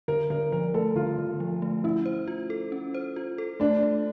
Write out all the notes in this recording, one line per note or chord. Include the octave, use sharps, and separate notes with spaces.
D3 A#4
D3 A#4
F3 A#4
A3 A4
D3 F4
D3
F3
A3
C#4 E4
C5
F4
A4
C#4
C5
F4
A4
A3 D4
A3